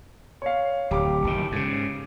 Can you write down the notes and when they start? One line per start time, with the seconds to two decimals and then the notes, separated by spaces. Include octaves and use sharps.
0.42 C#5 F5
0.91 D1 G4 D6
1.24 F#1 D#3
1.52 G#2 C#3